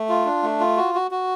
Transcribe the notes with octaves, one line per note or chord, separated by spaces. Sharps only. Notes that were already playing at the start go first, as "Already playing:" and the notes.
Already playing: A3
F4
D4
A3
F4
F#4
F#4
F#4